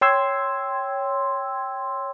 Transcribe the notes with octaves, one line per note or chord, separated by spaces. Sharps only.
C#5 G5 C6 E6 G#6